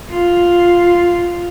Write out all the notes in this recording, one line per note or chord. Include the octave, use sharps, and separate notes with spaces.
F4